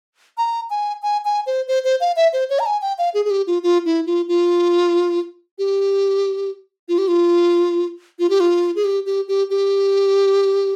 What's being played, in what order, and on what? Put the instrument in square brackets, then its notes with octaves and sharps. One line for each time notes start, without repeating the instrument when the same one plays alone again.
[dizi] A#5
G#5
G#5
G#5
C5
C5
C5
F5
E5
C5
C#5
A#5
G#5
G5
F5
G#4
G#4
G4
F4
F4
E4
F4
F4
G4
F4
G4
F4
F4
G4
F4
G#4
G4
G4
G4
G4